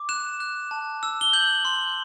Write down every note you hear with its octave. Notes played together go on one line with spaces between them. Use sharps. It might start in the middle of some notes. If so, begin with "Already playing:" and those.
Already playing: D6
F#6 E7
F#6
A5
E6
G7
G6 F#7
C6